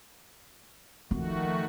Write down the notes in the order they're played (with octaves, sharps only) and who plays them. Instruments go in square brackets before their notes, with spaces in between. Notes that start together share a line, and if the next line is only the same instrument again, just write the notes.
[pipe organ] D#3 A3 F#4 [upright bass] F3